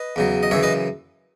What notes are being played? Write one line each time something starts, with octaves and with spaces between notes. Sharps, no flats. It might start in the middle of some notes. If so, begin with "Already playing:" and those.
Already playing: B4 D#5
E2 C#3 F#3
D#5
F#2 C#3 E3 C#5 E5
B4 D#5